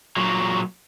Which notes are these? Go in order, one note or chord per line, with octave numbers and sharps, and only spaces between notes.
A#2 F#3